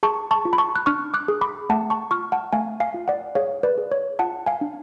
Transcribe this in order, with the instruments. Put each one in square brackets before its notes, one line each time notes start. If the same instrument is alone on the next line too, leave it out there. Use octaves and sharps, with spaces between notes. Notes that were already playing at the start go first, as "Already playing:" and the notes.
[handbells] G#4 A5 C#6
A5 C#6
F4
B5
A5 C#6
F#6
D4 C#6 F6
D6 F#6
G#4
B5 D6
A3 F#5 A5
A5 C#6
F4 C#6 F6
F#5 A5
A3 F5 G#5
F5 G#5
F4
D5 F#5
G#4 C#5 F5
B4 D5
G#4
C#5
F4 F#5 A5
F5 G#5
D4